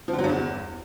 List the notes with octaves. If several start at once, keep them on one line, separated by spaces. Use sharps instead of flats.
F3
D3
F#3
G2
E2